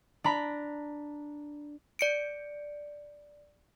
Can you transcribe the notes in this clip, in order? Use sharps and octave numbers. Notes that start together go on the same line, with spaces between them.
D4 A#5 B5
D5 C#7 D7